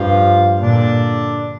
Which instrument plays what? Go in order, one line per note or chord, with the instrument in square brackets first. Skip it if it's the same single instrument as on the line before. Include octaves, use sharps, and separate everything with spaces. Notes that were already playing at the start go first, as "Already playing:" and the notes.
Already playing: [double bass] G2 [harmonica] F3 F4
[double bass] A#2 [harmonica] D3 D4